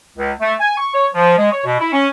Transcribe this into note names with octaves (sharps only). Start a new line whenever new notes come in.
C#2
A3
G#5
C#6
C#5
F3
G#3
C#5
B2
E4
C#4